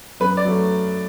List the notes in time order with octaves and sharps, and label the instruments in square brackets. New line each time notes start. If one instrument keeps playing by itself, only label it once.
[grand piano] F#2 B4
D5
F#3 A3